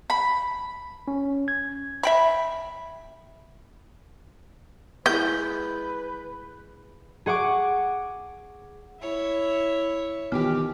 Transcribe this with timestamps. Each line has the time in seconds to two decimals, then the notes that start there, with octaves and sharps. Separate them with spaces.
0.10 B5
1.08 C#4
1.48 G#6
2.03 E5 G5 B5
5.06 G#3 E4 B4 G6
7.26 G#4 F#5 C#6 D6
9.01 E4 C#5 E5
10.32 D#3 E3 B3 G4 D6 F6